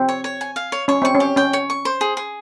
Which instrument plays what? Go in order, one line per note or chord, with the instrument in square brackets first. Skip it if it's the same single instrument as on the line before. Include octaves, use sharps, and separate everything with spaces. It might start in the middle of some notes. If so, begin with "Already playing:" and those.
Already playing: [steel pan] C4
[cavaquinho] C#5
C#5
G#5
F5
C#5
[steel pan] C#4 [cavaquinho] C#5
[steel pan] C4 [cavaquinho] C#6
[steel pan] C#4
[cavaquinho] G4
[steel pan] C#4 [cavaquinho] G5
[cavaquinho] C#5
C#6
C5
G#4
G#4